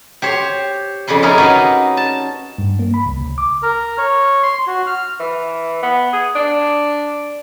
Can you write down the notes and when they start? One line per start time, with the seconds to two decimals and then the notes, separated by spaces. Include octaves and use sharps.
0.22 G4 C5 C#5
1.07 F2 C#3 D5 B5 C6
1.23 C#4 D#4 E4 G#4 A#4
1.38 C#4 D#4 F#4 B4 D5 D#5
1.97 A5
2.58 G2
2.79 A#3
2.94 B5
3.06 C2
3.21 C#2
3.38 D6
3.63 A#4
3.98 C#5
4.43 C6
4.67 F#4
4.87 F6
5.20 E3
5.83 B3
6.13 G#4
6.35 D4